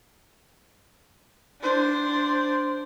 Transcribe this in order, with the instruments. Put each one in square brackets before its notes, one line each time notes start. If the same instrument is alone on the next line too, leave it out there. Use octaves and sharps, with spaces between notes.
[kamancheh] D4 C5